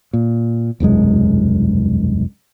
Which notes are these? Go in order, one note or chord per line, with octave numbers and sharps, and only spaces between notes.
A#2
E1 C2 F#2 G#3